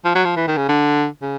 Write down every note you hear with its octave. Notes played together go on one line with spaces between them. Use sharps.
F3
F#3
F3
E3
D#3
C#3
D3
C#3